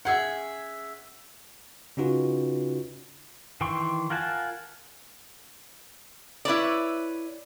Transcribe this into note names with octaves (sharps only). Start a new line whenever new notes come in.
C#4 G#4 E5 F#5
C#3 C#4 D#4 F4 F#4 B4
D#3 E3 G5 C6 C#6
F4 A#4 F#5 G#5 A5
E4 B4 C#5 D5